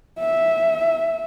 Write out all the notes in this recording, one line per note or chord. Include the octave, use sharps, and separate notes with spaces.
E5